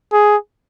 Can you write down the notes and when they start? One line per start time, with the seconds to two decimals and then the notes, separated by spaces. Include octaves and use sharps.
0.13 G#4